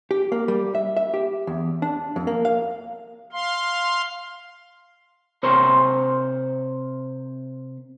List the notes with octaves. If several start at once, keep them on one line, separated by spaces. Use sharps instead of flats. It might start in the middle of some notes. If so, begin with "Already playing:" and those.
G4
A#3
G3
E5
E5
G4
E2
D4
F2
A#3
F5
F5 C6
C3 A#4 C5 C#5 C6